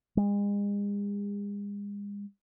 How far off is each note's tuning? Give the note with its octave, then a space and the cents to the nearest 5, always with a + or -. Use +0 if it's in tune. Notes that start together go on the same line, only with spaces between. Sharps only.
G#3 -40